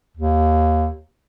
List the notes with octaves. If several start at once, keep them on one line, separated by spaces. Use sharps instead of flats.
D#2